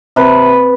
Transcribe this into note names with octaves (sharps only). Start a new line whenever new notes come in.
C3 B4